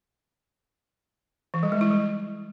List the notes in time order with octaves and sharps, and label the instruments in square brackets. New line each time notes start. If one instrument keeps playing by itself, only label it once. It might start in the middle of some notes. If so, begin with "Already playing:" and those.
[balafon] E3
G3
G#3
E4
G3